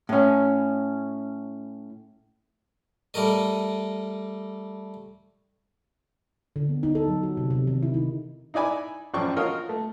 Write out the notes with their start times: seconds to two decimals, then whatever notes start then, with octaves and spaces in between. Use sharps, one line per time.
0.09 A2 C#4
3.14 G3 A3 A#4 D#5
6.56 D3
6.69 B3
6.83 D#4
6.95 A4
7.08 F#3
7.23 F#4
7.37 C3
7.51 C3
7.67 D#3
7.83 E4
7.94 D#4
8.54 D#4 E4 D5 G#5 B5
9.14 A1 F#2 F3 D5 G5 C#6
9.37 F4 F#4 A#4 C#5 D#5
9.69 A3